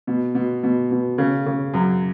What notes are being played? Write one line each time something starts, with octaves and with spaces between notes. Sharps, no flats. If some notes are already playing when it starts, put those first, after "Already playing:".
B2
B2
B2
B2
C#3
C#3
F#2